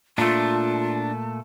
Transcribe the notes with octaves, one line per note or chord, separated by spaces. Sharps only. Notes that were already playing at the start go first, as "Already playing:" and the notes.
A#2 A3 D4 F4 A5